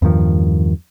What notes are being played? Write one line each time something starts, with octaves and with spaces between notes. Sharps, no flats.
E2 G2 D#3 F3